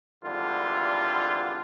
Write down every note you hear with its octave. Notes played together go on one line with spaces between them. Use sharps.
G#1 E2 D3 G3 F4